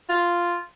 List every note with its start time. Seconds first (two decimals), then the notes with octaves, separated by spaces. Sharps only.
0.09 F4